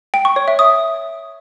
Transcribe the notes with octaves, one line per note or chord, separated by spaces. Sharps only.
G5
C#6
C#5
E5
D#6